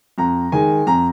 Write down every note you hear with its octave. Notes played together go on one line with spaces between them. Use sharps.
F2 A#5
D#3 G#3 G#5
F2 A#5